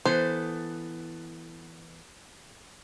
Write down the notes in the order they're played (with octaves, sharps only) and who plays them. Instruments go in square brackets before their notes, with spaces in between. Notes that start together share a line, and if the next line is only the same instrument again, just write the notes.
[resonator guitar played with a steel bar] E3 B3 A4 [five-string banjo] C5